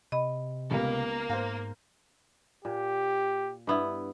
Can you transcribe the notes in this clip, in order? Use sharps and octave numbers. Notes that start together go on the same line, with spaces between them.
C3 D#5 B5
C#2 G3 A#3 B3
G#2 C5 F5
A#2 G4
G2 B3 E4